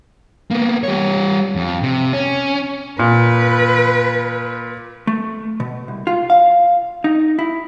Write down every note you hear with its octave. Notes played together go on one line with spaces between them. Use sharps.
A#3 B3
G3 C#5
F2
C3
C#4
A#2 B4
A3
B2
C2
F4
F5
D#4
E4